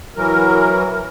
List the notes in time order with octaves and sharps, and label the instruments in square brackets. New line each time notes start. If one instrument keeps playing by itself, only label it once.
[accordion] E3 F#3 A#4